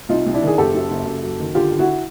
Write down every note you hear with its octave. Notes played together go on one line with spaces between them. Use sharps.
C2 D#4 F4
C2
D4 E4
D#3
G#4
F#1 G4 A4
F#2
F#1
F#1
F#3
D#3
D3 F4 G4
D3
E4 F#4